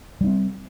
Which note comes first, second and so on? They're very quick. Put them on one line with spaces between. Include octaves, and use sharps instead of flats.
G3 D4 C4